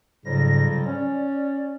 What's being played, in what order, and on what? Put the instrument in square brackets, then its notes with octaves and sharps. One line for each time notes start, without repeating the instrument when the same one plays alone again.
[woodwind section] F2 F#3 G3 [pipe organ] G#2 C#3 A#6
[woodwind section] C#4 [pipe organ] D5